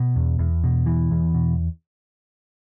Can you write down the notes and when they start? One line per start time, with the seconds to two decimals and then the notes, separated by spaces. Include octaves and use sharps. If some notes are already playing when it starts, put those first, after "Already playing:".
Already playing: B2
0.16 E2
0.39 E2
0.64 B2
0.86 E2 E3
1.11 E2
1.34 B2